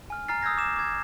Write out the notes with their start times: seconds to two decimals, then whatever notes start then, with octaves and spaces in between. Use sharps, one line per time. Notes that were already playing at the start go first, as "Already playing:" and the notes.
0.10 G#5 F6
0.28 G#5 A#5 F6 A6 C7
0.43 D#6 E6 G6 G#6 A#6
0.58 D6 E7
0.76 D6 G#6